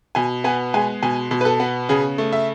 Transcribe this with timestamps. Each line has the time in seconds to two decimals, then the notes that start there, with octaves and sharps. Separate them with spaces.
0.15 B2 G#5
0.44 B3 G#5
0.74 G#3 G#5
1.03 B2 G#5
1.31 B2
1.41 B4
1.45 A4
1.60 B3
1.89 C#3 G#4
2.18 A3
2.32 E5